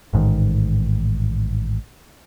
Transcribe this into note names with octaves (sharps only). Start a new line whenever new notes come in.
A1 G#2 D#3